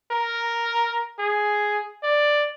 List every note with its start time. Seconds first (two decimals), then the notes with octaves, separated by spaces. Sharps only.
0.12 A#4
1.19 G#4
2.03 D5